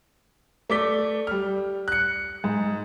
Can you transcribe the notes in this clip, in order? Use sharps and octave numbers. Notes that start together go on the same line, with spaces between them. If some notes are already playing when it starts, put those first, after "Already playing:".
A3 D5 D6 B6 G7
G3 F6
F#6 C#7
G#2